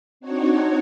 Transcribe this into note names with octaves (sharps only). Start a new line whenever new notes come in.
C4 D4 D#4 F#4 C#5